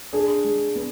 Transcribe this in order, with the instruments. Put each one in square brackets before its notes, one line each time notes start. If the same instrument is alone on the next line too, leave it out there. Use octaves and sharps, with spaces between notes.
[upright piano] D4 [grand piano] G#4
[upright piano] G#3
B3